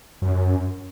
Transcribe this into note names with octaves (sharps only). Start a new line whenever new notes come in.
F#2